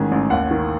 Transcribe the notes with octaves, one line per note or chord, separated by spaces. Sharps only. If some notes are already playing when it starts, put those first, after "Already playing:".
Already playing: A1 G#2 D#3 G#5
A1
D#2 F#5
D#3